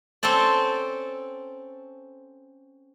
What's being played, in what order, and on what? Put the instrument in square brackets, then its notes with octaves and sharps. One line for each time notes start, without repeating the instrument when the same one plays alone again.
[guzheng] C4 C#4 A4 C5 D5